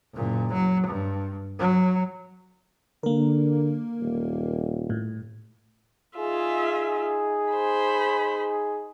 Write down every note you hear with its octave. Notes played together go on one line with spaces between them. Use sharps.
F#1 A#2
F#3
G2
F#3
D3 A#3 A#4
D#1
A2
D#4 F4 G#4 E5
C5 B5